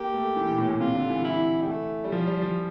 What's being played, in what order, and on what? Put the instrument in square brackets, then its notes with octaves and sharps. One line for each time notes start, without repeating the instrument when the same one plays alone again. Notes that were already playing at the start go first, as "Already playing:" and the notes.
Already playing: [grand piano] A#3 [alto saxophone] G4
[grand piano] A3
E3
A#2
A2
A#2
[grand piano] C3 [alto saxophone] F4
[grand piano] D3
E3
[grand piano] E3 [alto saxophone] E4
[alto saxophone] G3
A3
[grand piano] G3
[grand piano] F3 [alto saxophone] F4
[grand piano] G3
F3